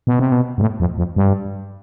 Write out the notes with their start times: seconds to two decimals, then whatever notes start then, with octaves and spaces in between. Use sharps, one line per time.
0.07 B2
0.19 C3
0.32 B2
0.58 G2
0.61 A2
0.80 F2
0.98 F2
1.16 G2